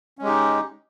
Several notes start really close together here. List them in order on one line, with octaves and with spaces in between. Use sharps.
C#4 G#3 G4 D#4